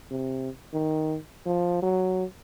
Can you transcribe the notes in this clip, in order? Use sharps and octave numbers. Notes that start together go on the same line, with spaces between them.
C3
D#3
F3
F#3